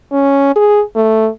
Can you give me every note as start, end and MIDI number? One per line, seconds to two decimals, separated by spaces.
0.12 0.52 61
0.56 0.82 68
0.95 1.28 57